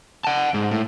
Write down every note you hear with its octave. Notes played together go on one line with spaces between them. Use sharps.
F#5 A5
G#2
A2